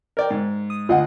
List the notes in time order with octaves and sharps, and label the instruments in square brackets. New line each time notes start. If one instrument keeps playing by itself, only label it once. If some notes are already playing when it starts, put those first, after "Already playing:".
[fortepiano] A#4 D5 G5
G#2
[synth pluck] D#6
[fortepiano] D2 [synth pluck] F4 D#5 F#5